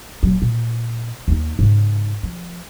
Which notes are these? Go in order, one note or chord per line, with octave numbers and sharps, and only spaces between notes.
D#1 F#3
A#2
D#2 D#4
G#2 C#3
F3